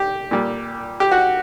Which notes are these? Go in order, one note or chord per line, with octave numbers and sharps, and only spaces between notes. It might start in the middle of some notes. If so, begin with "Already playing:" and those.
Already playing: G4
A#2 G3
G4
F#4